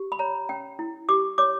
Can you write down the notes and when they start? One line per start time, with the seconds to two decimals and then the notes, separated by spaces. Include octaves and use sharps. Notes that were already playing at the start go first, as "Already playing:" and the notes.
Already playing: G4
0.12 B5
0.19 C#5 A#5
0.49 C#4 G5
0.79 E4
1.09 G4 D6
1.38 C#5 D6